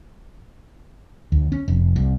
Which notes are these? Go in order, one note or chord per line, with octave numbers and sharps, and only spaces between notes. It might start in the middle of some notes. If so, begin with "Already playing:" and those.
D2
C#4
F1
C2